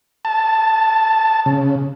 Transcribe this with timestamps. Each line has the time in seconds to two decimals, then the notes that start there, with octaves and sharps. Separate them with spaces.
0.25 A5
1.46 C#3